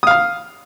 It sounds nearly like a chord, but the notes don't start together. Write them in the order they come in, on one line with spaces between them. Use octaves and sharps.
D#6 F5 F6